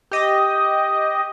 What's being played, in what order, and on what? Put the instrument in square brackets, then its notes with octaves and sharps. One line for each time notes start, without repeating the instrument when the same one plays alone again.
[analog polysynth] G4 D#5